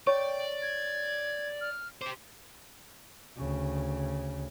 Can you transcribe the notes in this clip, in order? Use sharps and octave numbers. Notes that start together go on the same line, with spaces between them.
C#5 D5 G5 C#6
G#6
F6
G4 C5 D6
D2 C#3